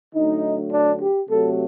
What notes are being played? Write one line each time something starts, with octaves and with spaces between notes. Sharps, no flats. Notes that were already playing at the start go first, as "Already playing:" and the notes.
D3 F#3 A3 D#4
D4
G4
C3 F#3 A3 A4